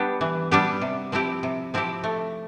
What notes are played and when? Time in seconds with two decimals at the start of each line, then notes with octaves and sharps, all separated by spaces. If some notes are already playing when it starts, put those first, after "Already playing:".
Already playing: G3 B3 D4 G4
0.21 E3
0.51 G3 B3 D4 G4
0.81 C3
1.12 F3 C4 E4 G4
1.43 C3
1.74 F3 C4 E4 G4
2.04 A3